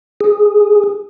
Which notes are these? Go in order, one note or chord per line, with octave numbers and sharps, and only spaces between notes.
G#4